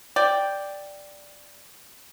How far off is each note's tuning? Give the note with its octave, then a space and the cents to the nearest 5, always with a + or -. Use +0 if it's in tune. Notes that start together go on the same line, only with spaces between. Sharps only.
D5 +0 G5 +0